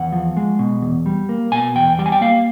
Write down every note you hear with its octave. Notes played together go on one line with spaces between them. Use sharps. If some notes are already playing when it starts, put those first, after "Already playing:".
Already playing: E2 F#5
F3
G#3
B2
E2
G3
A#3
B2 G#5
E2 G5
G3 G5
G#5
G5
A#3 F5